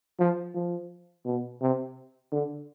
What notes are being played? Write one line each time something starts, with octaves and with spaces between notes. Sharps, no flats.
F3
F3
B2
C3
D3